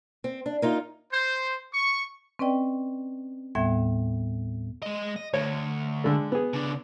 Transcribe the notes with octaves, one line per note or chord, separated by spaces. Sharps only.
C4
D4
A#3 D#4 F4
C5
C#6
C4 C#4 B4 D5 D#5 G5
D#2 A2 G3 B3 E5 G#6
G#3 D#5
D#5
D2 C#5
D3 G#3 A4
B3 G#4
C#3 D4